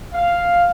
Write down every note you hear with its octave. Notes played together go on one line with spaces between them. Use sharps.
F5